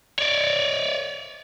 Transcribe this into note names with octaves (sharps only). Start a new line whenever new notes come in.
C#5 D5